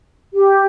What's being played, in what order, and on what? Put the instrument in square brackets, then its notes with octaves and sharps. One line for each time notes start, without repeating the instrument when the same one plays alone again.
[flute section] G4